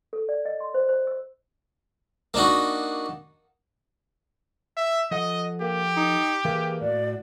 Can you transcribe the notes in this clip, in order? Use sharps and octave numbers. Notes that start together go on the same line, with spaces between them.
A4
D5
D#5
C6
C5
C5
E6
A#3 D4 D#4 F#4
E5
F3 A4 D#5 F#5
A#3 G4
D#4
E3 A#3 G#4 B4
A2 F#4 D5